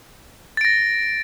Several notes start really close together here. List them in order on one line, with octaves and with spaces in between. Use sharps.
A6 D7 A#6